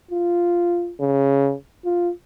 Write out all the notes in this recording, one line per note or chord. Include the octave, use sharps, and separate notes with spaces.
F4
C#3
F4